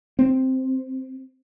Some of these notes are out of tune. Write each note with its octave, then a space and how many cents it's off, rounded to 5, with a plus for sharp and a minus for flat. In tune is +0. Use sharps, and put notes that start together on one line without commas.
C4 +0